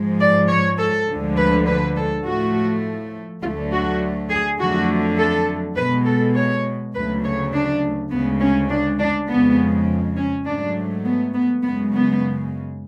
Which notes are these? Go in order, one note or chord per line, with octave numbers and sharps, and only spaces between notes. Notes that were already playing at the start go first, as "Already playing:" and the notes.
Already playing: G#2 F3 G#3
D5
C#5
A4
D2 D3 F3 G#3
B4
B4
A4
A2 F3 A3 F#4
D2 D3 F#3 A3 F4
F#4
G#4
F2 D3 F#3 A3 F#4
A4
B2 G#3 B4
A4
C#5
D2 C#3 F#3 A3 B4
C#5
D4
D2 C#3 G#3 B3
C#4
D4
D4
F2 C#3 G#3 B3
C#4
G#2 F#3 A3 D4
B3
B3
F#2 C#3 G#3 B3
B3